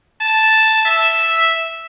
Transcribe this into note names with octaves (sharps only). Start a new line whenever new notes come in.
A5
E5